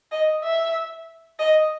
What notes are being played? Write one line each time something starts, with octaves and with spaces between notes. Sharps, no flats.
D#5
E5
D#5